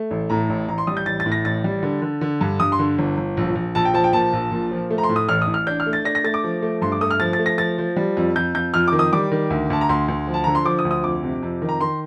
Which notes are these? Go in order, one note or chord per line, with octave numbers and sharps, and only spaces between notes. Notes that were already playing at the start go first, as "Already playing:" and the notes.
Already playing: A3
A1
A2 A#5
A1
A1 A#5
C6
G3 D#6
G6
A1 A6
A6
A2
A#6
A1 A6
G3
D3
D3
D3
G2
G2 D#6
C6
D3
G1
G1
A#1
A#1
A#1 A5
G5
F3 A5
G5
A#2 A5
A#1
A#2
F3
A3
A#5
C6
A2
D#6
A1 F6
D#6
A1
F6
D4 G6
F6
A3
A6
D4 A#6
A#6
A3 A6
D6
F3
A3
G2 C6
D6
A3 D#6
F6
F3 A6
A6
A3
A#6
F3 A6
F3
G3
F2
F2 G6
F2 G6
F2 F6
D#3 D6
D#6
G3 D6
D#3
D2
D2 A5
A#5
D2 C6
D2
F3
A5
D3 A#5
C6
F3 D6
D#6
D2
D#6
F2 D6
C3
F2
D#3
A#5
D#3 C6